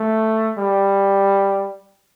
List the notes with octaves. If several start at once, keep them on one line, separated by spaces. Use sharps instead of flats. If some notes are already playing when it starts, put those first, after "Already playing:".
Already playing: A3
G3